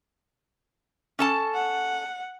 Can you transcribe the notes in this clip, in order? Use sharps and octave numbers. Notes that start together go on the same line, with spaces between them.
C#4 A4 A5
F#5